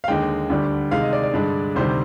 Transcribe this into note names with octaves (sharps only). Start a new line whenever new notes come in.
F5
D#2 D3 G#3 G5
D2 D3 G3 D4
C3 D#3 G#3 F5
D#5
D5
D5
G2 D3 G#3 D4
D2 C3 D#3 G3 C5